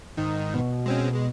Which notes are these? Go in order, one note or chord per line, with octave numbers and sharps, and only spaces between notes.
G#2 D#3 D#4
B2
G#3 C4 C#4
G#3